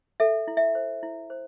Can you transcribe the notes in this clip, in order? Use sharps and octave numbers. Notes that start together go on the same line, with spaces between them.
A4 E5
E4
E5
C5
E4
C5